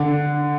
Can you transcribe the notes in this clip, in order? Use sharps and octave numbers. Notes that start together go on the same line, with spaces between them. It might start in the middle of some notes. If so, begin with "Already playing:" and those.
Already playing: D3